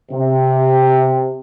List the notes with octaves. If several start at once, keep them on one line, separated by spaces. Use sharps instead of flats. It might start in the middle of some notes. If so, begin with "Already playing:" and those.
C3